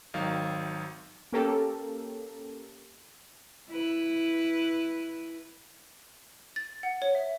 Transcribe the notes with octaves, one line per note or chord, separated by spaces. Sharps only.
G#1 D#3 F#3 F5
A#3 C#4 G4 A4 A#4
E4 B4
A6
F#5
C#5
E5